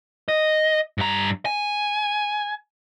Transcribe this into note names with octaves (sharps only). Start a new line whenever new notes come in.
D#5
G2 A#5
G#5